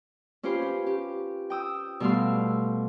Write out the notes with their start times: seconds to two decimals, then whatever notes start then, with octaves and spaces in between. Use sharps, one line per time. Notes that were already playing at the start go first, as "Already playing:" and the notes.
0.43 C#4 F4 G4 B4 C5
0.62 C#4
0.86 G4
1.50 G5 D#6 E6
2.00 B2 G3 A3 F5 C6 E6